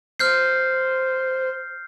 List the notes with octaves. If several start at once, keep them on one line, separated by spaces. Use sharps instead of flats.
C5 F6 G6 C7